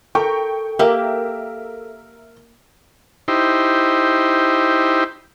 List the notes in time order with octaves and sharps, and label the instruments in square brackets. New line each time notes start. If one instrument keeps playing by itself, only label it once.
[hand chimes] A4 [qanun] A#4 [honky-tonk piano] G5 C#6
[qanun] A#3 G4 [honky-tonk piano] A#4 E5
[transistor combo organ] D#4 E4 G4 C5